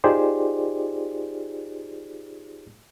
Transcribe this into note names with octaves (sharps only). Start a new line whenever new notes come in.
D#4 F4 G4 G#4 C5 D5